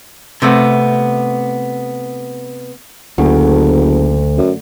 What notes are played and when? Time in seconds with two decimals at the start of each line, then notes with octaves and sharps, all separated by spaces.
0.42 C3 A3 B3
3.18 F#1 D2
4.38 F#2